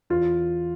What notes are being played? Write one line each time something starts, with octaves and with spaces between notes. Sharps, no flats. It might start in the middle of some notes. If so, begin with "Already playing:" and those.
E2 F4